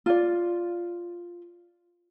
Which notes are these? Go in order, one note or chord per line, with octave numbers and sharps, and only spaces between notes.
F4 D5